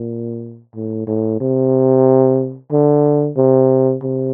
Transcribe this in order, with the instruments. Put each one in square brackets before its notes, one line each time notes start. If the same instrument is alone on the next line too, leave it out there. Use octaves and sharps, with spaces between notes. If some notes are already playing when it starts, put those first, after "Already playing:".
Already playing: [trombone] A#2
A2
A2
C3
D3
C3
C3